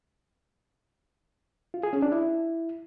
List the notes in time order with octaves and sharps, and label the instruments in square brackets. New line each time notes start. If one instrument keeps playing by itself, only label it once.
[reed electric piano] F4
G#4
C#4
D4
E4